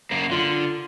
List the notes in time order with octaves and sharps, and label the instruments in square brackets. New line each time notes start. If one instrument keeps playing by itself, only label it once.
[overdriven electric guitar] F#2 A#3
[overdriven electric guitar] D3 [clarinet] F4